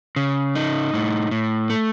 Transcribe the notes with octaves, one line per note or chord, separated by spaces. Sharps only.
C#3
D#4
A2
A2
A3